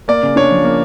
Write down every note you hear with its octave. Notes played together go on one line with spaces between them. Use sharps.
A#3 D5
C#3
D4 C#5
F3
A#3